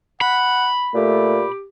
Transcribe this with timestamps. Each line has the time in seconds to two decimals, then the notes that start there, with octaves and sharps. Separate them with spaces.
0.21 F#5 B5
0.95 A#2 A3 G4